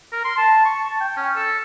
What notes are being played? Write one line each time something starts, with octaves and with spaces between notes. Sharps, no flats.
A#4
C6
A5
C#6
A5
G5
C#4
A4